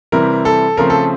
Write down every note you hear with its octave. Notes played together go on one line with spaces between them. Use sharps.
C3 E3 G3 C4 E4 A#4
A4
C#3 F3 A3 C4 A#4
A4